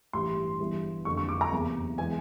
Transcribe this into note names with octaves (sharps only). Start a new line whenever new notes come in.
A1 G2 E3 G3 C6
G1 G2 E3
F#1 F2 D3 C#6
C#6
D6
A#5
F#1 E2 C3 E3
E3 G#3 B3 G#5